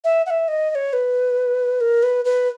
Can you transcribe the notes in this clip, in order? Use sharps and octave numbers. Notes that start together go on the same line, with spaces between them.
E5
F#5
E5
D#5
D#5
C#5
B4
A#4
B4
B4